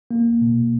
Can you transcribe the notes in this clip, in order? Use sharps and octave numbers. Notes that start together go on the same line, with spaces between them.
A#3
B2